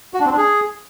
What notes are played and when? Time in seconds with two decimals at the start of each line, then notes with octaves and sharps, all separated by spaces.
0.14 F#4
0.20 D4
0.26 C4
0.32 D4
0.37 G#4